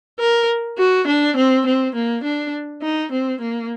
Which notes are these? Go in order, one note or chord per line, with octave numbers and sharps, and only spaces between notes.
A#4
F#4
D4
C4
C4
A#3
D4
D#4
C4
A#3